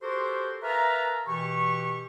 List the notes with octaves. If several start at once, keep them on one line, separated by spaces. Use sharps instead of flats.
F#4 G4 A4 A#4 C5
A#4 B4 E5 F5 A5 A#5
B2 E3 G4 C#6